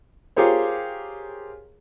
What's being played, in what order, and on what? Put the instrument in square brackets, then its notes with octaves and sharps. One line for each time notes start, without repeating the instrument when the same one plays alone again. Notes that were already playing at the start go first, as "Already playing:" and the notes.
[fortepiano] F4 G4 G#4 A#4 C5 C#5